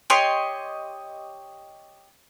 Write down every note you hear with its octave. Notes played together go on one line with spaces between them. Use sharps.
G4 C#5 D#5 C6